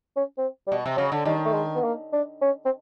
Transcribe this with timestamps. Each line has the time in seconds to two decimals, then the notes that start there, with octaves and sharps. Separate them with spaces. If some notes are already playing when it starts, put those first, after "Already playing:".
0.16 C#4
0.38 C4
0.67 G3
0.72 B2
0.86 C3
0.96 C#3 F#3
1.12 D3
1.25 D#3 G3
1.45 A3
1.54 G#3
1.75 B3
1.84 A#3
2.13 D4
2.42 C#4
2.65 C4